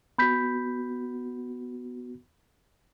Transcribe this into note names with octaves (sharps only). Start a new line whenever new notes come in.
B3 F#4 B5 G6 B6